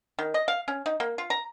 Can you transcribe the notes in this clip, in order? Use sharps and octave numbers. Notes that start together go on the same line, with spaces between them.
D#3
D#5
F5
C#4
D#4
A#3
F4
A#5